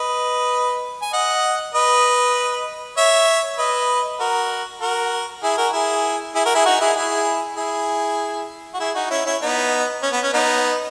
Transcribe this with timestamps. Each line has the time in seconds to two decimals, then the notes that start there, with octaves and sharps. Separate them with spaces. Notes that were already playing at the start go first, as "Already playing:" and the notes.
Already playing: B4 D#5
1.02 G#5
1.13 D#5 F#5
1.74 B4 D#5
2.98 C#5 E5
3.58 B4 D#5
4.20 F#4 A#4
4.81 F#4 A#4
5.44 E4 G#4
5.58 F#4 A#4
5.73 E4 G#4
6.35 E4 G#4
6.46 F#4 A#4
6.55 E4 G#4
6.66 D#4 F#4
6.81 E4 G#4
6.96 E4 G#4
7.58 E4 G#4
8.74 F#4
8.80 E4 G#4
8.95 D#4 F#4
9.10 C#4 E4
9.26 C#4 E4
9.42 B3 D#4
10.03 C#4
10.13 B3
10.23 C#4
10.34 B3 D#4